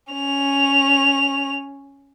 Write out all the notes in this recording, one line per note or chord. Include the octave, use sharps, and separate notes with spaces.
C#4 F7